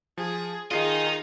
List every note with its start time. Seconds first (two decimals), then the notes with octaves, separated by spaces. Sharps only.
0.18 F3 G#4
0.71 D#3 D#4 F4 G#4 D#5 C7